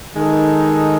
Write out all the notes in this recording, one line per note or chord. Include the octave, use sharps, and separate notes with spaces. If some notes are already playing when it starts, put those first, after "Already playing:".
D#3 G#3 D#4 A4